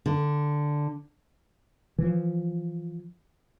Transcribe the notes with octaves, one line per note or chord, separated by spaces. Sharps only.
D3
E3 F3